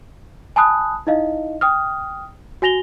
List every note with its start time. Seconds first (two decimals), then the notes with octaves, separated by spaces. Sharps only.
0.56 G#5 A5 B5 D#6 F#6
1.07 D#4 E4 D#5 F5
1.61 G5 D#6 F6
2.62 F#4 G#5 A#6 F7 G7